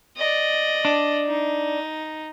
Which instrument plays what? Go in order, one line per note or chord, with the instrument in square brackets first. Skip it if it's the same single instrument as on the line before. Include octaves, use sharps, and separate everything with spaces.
[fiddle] D5 D#5
[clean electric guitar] D4
[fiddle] D#4